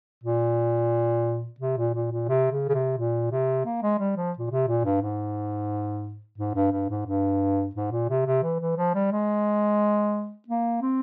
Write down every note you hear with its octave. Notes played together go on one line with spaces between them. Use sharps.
A#2
C3
A#2
A#2
A#2
C3
C#3
C#3
C3
A#2
C3
A#3
G#3
G3
F3
A#2
C3
A#2
G2
G#2
G#2
G2
G2
G#2
G2
G#2
A#2
C3
C3
E3
E3
F3
G3
G#3
A#3
C4